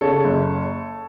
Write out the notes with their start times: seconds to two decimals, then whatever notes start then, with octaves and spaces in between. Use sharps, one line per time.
0.01 C#3 A4 C#5
0.24 F#1